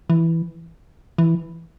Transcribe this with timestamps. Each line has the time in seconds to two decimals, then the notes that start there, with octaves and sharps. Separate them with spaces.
0.10 E3
1.18 E3